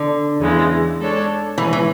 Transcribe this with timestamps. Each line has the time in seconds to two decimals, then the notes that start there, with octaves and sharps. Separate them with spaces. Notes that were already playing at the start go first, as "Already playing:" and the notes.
Already playing: D3
0.39 E2 C#3 E3 G#3
0.99 G#3 D4 A4 C#5
1.57 A2 E3 G#3 C#4 G#4 B4
1.73 E3